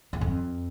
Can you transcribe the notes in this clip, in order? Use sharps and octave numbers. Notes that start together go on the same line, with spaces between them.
E2
F2